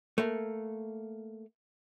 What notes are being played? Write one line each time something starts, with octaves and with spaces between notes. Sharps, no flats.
A3 A#3